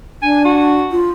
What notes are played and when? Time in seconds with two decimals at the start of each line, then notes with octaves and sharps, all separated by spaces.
0.22 D4 G#5
0.45 F#4
0.91 F4